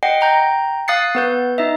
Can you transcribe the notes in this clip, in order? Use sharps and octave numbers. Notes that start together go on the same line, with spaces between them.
D#5 F#5 G5 C7
G5 A#5 G6
F5 D#6 F#6 A6 C7 C#7
B3 B4 G6
D#4 D#5 E5